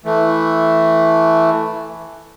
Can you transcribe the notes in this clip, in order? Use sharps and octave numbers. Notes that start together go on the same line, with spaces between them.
E3 A3